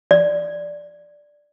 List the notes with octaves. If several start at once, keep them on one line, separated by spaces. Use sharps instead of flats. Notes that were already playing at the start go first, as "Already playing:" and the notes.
D5